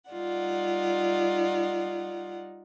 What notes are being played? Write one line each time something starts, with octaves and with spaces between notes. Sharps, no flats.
G3 D#4 F4 D5 F#5